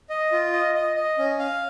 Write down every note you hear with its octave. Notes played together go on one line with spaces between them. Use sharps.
D#5
F4
D#5
D#5
D#5
C#4
F5